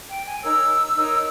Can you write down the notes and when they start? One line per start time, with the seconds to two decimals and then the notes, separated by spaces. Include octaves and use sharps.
0.09 G5
0.25 G#5
0.43 D#4 A#4 C#5 E6
0.96 D#4 A#4 C#5